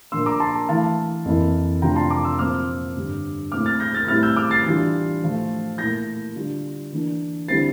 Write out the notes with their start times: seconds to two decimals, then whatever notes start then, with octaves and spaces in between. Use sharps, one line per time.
0.12 A#2 F3 A#3 D4 C6 E6
0.26 A#5 D6
0.40 A5 C6
0.69 E3 A3 E4 F5 A5
1.25 F2 E3 A#3 E4
1.82 C3 F3 A3 D4 F4 G5 A#5
1.96 A5 C6
2.10 A#5 D6
2.24 C6 E6
2.39 A#2 F3 C4 F4 D6 F6
2.95 G2 D3 G3
3.52 A#2 A3 C4 E4 D6 F6
3.66 F6 A6
3.80 G6 A#6
3.94 F6 A6
4.08 A2 G3 C4 E4 F6 A6
4.23 E6 G6
4.37 D6 F6
4.51 A6 C7
4.65 E3 G3 D4 F4
5.22 A2 F3 A3
5.78 A#2 A3 E4 G6 A#6
6.35 D3 G3 D4 F4
6.92 E3 A#3 D4
7.48 D3 G3 C4 E4 A6 C7